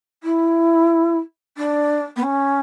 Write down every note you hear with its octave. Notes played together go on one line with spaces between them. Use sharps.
E4
D4
B3
C#4